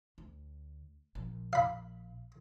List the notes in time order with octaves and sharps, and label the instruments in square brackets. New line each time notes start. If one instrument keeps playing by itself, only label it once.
[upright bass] D2
A#1
[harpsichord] F5 B5